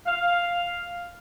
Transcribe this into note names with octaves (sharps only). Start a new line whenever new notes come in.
F5